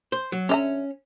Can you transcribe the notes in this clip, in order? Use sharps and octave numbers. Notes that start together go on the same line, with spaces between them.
C5
F#3
D3 C#4 E5 A#5